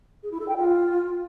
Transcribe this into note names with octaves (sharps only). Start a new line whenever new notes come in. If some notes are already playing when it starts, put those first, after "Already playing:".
G#4
E4
A4
G5
F4